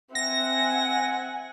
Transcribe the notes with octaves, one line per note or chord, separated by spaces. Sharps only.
C4 E5 F#5 G#5 A#6